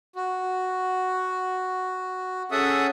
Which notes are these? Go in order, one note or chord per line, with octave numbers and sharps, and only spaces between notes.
F#4
C#4 G#4 A4 E5 F#5 D#6